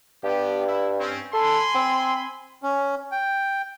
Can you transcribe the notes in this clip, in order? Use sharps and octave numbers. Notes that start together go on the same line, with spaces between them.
G2 B3 G4
E4
C4 C#4
A4 G#5 B5 C6
C4
C#4
G5